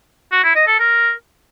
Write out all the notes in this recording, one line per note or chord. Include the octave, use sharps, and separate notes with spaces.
F#4
E4
D#5
A4
A#4